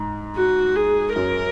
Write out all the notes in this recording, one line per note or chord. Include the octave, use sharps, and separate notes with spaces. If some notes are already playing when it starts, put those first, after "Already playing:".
Already playing: G#2
F#4
G#4
F#2 A#4